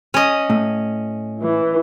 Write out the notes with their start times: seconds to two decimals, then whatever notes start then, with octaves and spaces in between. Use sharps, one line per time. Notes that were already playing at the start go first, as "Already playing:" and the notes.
0.14 C#4 D#5
0.50 A2
1.42 E3